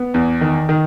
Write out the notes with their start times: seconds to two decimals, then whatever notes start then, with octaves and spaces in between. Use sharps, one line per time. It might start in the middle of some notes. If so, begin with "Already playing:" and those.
Already playing: B3
0.14 E2
0.41 D#3
0.69 D#3